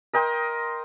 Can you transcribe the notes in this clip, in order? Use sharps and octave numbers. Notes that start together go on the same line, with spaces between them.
A#4 D#5 G5 C6